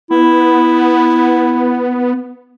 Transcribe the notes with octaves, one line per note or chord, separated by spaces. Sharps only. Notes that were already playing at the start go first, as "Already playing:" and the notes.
B3 E4